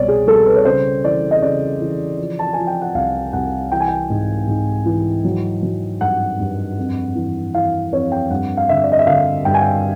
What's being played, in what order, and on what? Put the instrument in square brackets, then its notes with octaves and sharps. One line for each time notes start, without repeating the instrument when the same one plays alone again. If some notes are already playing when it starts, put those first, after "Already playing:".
Already playing: [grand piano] C2 B2 G3 C#5 D5
G#4
G3 A4
B4
C#5
C#3 C5
E3 D5
D#5
C#3 D5
E3
F3
A5
F3 G#5
G5
F#5
C2 F5
C2 F#5
E3 G5
G#5
G5
G#2
G#2
E3
F#3
F#3
G2 F#5
G2
F2
E3
E3 F5
F2 C#5
G5
G2 F#5
F5
D3 E5
D5
D#5
E5
D3 F5
G2 G5
G#5
G5